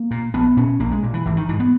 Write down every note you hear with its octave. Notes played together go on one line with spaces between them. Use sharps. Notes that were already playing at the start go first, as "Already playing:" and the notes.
Already playing: A#3
A#2
A#1 B3
A#2 C#4
A#1 A#3
G#3
A#2
E3
G#1 E3
D#3
G#2 E3
B3